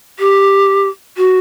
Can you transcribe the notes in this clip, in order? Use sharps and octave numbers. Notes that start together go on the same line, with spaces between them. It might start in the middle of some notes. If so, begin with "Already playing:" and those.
G4
F#4